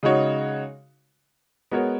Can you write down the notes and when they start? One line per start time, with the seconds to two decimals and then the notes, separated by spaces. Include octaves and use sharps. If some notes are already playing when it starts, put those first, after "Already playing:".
0.03 C#3 G#3 D#4 F#4 C#5
1.71 G#3 B3 F#4 A#4 C#5